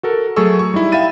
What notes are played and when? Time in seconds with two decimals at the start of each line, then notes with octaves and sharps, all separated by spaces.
0.03 F#4 A4 A#4
0.36 F#3 A3 G#4 A4 C#6 E6
0.59 C#6
0.74 G3 D#4 E4
0.92 E5 F5 G5 B5 A6 D#7